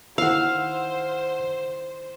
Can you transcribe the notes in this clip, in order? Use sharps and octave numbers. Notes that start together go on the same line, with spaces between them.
D#3 E4 C5 F5 F#5 E6